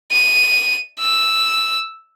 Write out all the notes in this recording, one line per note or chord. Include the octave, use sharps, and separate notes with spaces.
D#7
E6